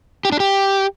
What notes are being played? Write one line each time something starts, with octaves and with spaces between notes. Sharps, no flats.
G4
D4
G4